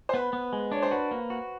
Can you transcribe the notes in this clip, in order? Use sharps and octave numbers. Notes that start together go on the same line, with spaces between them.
C5
B3 B4
B3
G#3
D4 C#5
C5
F#4 B4
A#3
F#4